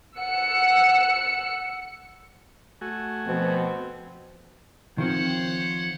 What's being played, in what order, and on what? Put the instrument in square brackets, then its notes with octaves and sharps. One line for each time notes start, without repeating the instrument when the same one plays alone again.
[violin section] F#5 E6 C#7
[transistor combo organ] A3 F#4 G#5
[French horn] B2 [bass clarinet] F3 [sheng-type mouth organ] C4
[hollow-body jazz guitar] D#3 F3 C4 [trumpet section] C5 C#5 F#5